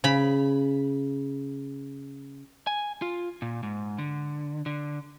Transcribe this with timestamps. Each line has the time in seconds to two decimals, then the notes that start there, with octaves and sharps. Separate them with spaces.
0.04 C#3 B5
2.67 G#5
3.02 F4
3.42 A#2
3.63 G#2
3.98 D3
4.66 D3